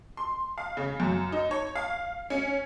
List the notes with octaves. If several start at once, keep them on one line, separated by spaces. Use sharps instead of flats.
C6
F5
C#3
F#2
D#4
C#5
F5
C#4